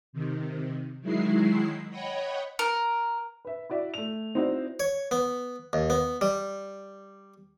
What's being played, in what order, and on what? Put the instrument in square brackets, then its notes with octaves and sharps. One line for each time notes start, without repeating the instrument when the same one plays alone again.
[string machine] C3 D#3
D#3 F#3 G#3 E4 C7
C#5 D#5 F#5 G5 B5
[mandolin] A#4
[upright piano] B4 E5
E4 F#4 D5 E5
A3 F7
C4 D#4 E4 F#4 C5 D5
[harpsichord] C#5
B3
D#2
B3
G3